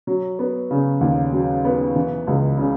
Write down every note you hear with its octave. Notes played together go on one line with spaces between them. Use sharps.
F#3
B3
C#3
D#2
F#3
B3
E3
C#2
C#3